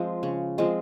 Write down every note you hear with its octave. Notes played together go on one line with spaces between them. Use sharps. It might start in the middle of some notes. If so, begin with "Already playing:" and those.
Already playing: F3 G#3 C4
C#3
F3 G#3 C4